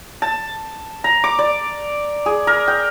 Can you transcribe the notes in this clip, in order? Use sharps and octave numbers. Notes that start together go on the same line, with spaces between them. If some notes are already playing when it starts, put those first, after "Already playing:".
A5
A#5
D6
D5
G#4
A#4
G5